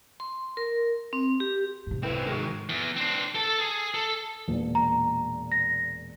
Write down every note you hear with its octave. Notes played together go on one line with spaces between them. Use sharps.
C6
A#4
C4
G4
G#2 C3
E3 C4 E4 B4
D#3 G#3 F#4 G#4 A#4
E2
C4 D4
A4 A5
G#4
A4
E1 A#2
A#5
A#6